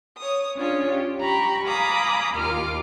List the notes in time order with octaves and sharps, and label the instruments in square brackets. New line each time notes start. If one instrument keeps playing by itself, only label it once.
[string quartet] C#5 D#6
C#4 D4 F4 G#4 C#5
G4
G4 A#5 B5 C#6
F5 G#5 A#5 B5 D6 D#6
D#2 F4 A#4 D6 F6